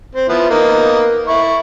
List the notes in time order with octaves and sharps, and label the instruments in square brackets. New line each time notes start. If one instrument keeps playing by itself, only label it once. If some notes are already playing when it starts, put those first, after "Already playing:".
[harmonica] C4
F3 B3 E4
A#3 B3 D#4
E4 C#6